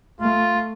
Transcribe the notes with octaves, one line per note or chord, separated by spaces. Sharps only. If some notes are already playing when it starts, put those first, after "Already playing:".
A3 F4